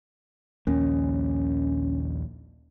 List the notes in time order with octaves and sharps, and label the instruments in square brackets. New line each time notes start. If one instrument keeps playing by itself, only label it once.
[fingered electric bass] A#1 D#2 A#3 [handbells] C#4